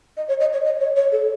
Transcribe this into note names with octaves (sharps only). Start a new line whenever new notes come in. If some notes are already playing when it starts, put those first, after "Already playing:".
D#5
C#5
D#5
C#5
D#5
C#5
C#5
A4